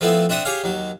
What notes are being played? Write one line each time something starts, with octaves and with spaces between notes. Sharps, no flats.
F3 A3 B3 C4 E4
C4 D4 E5 F#5 D#6
G4 G#4 C#5 F5
D#2 F#3